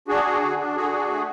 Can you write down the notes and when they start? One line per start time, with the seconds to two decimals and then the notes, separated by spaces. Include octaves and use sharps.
0.08 D4 F#4 G#4
0.26 D4
0.42 D3
0.58 D4
0.76 D3 F#4 G#4
0.92 D4
1.09 A3